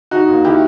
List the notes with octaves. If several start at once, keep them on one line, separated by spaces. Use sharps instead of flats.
D#3 D#4 F#4
D#2
D#3 E4 G4